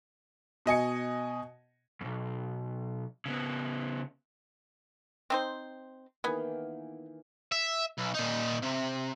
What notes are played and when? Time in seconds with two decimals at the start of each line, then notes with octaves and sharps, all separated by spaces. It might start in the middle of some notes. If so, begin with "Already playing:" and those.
0.66 B2 D#5 G#5 C#7
2.01 B1 F2
3.26 C#3 B3
5.30 C4 D#4 C5
6.24 D#3 E3 A#3 B3 G#4
7.52 E5
7.98 B1
8.14 A#2 D#4
8.62 C3